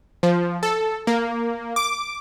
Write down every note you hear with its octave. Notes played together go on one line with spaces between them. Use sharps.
F3
A4
A#3
D6